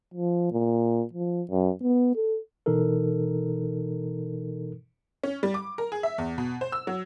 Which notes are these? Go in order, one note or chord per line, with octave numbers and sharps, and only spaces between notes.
F3
A#2
F3
F#2
B3
A4
B2 E3 D#4 A4 A#4
C#4
G3
D6
A#4
G#4
E5
E2
B2
C5
E6
F#3